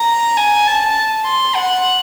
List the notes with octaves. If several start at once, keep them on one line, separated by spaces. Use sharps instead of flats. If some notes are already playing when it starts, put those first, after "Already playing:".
Already playing: A#5
G#5
A5
C6
F#5